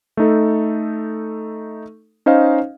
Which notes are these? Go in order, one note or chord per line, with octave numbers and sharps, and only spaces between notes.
A3 D#4 A4
C#4 D#4 C5 D#5 F5